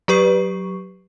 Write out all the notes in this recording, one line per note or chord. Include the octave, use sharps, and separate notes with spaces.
F#3 G4 B4 C#6 C7